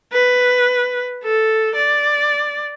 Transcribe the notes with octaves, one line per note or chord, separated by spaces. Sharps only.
B4
A4
D5